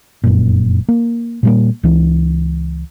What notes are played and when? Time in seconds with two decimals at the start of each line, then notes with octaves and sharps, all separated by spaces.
0.24 F1 F#2 A#2
0.88 A#3
1.43 A#2 G3 A#3
1.83 C#2 E3